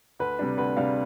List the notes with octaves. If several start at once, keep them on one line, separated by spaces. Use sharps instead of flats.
D2 B4
C3 G3 D4
D2 B4
C3 G3 D4 F5